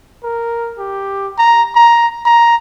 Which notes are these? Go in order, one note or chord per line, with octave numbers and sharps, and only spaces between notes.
A#4
G4
A#5
A#5
A#5